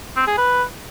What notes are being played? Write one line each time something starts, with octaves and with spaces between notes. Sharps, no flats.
C4
G#4
B4